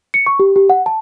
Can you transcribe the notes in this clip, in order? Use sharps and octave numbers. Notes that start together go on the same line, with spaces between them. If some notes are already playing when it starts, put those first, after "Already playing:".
C#7
C#6
G4
G4
F#5
A5